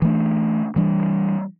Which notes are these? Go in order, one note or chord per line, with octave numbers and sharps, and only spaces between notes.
E3 A3 D4
E3 G3 D4